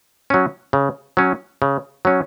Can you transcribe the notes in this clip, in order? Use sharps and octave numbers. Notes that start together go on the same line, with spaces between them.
F#3 C#4
C#3
F#3 C#4
C#3
F#3 C#4